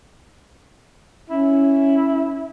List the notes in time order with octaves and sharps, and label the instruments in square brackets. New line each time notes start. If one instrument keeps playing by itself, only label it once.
[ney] C#4 [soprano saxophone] E4